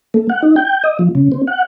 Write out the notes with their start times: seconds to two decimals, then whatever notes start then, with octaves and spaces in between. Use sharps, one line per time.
0.14 A3
0.30 F#5
0.43 D#4
0.56 G5
0.84 D#5
0.99 F3
1.15 C#3
1.32 C4
1.47 F#5